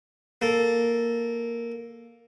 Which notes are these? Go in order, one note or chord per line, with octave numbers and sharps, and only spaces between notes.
A#3 A4